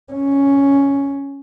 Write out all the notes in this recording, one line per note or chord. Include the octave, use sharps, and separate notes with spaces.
C#4